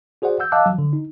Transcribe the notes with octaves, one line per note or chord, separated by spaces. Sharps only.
F#4 G#4 C5 D5 F#5
F#5 E6 G6
D#5 F5 A5 D6 E6 F#6
F3 F#3
D3
D#4